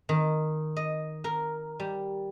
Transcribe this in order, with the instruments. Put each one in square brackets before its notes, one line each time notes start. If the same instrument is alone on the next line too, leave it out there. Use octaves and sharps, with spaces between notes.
[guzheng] D#3
D#5
A#4
G3